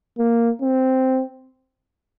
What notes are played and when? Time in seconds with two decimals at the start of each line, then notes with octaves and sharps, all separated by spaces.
0.19 A#3
0.62 C4